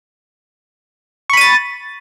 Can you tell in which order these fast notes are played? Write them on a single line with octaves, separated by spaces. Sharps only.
C#6 B5 D#7 A6